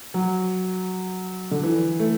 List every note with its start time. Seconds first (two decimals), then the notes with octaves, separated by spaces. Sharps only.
0.14 F#3
1.51 D3
1.63 E3
2.00 A3